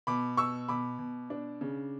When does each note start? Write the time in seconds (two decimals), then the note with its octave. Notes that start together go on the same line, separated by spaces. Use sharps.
0.07 B2 B5 D6
0.37 B2 C#6 E6
0.69 B2 B5 D6
0.99 B2
1.30 D4
1.61 C#3